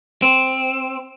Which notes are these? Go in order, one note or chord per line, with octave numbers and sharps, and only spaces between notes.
C4